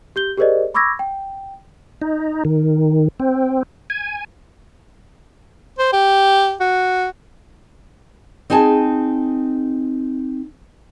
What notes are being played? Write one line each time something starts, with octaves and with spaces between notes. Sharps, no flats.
G4 G6 G7
G4 G#4 A#4 C5 D5 D#5
B5 C#6 D6 E6 G#6 A#6
G5
D#4
D#3
C4
G#5
C5
G4
F#4
C4 D#4 G#4 G#5 A5